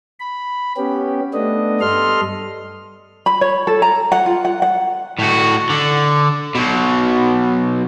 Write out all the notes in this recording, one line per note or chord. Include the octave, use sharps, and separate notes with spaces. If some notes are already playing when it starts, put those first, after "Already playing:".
B5
B3 C#4 G4
A3 B3 D4 D#5
G2 G3 A4 D#5 C6 F6
B5
C#5
A4
A#5
F#5
F4
F#5
F#5
A2 F#4
D3
B2 F#3